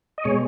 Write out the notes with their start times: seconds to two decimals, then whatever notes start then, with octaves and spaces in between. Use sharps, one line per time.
0.18 D#5
0.24 B2 G#3 C#5